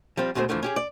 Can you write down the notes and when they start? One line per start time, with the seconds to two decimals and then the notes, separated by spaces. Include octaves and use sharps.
0.17 F3 G3 C4
0.35 D2 B2 G#3 A3 C5
0.49 E2 D3 E3 F3 A3
0.63 C#4 G4 G#4
0.76 D5